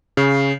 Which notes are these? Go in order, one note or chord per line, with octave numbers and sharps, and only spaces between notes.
C#3